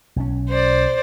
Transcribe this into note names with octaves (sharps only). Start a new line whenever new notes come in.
B1 C#4
C5 D5